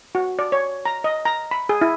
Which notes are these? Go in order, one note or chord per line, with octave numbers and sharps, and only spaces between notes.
F#4
D5
C#5
A#5
D#5
A#5
B5
G#4
E4